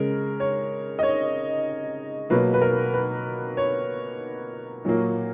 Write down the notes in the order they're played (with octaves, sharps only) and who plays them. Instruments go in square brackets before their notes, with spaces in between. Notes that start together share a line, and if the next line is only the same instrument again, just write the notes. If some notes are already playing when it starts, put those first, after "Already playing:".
Already playing: [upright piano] C#3 G#3 A#4
C#5
D#5
C#5
B2 F#3 A#3 B4
B4
A#4
B4
C#5
A#2 F#3 A#3